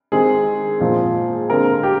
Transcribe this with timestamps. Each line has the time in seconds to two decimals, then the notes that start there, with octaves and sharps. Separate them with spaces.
0.12 D#3 G#3 C4 G#4
0.80 A#2 F3 G#3 C4
1.49 D3 G#3 C4 A#4
1.83 G4